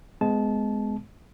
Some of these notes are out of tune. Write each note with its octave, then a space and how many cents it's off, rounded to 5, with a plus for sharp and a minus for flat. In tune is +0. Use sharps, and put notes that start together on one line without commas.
G#3 +10 B3 +30 A5 -20